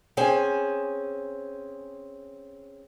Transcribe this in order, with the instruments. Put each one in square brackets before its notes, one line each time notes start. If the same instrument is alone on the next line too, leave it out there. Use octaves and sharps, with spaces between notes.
[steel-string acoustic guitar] C4 C#4 G#4 G#5